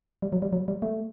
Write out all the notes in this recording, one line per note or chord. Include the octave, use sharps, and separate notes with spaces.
G3
F#3
G3
F#3
G3
A3